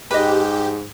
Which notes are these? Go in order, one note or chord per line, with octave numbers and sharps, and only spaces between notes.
G#2 G4 B4 D#5